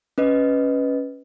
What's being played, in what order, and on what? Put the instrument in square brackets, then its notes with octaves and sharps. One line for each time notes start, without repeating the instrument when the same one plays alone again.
[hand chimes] C#4 B4 D#5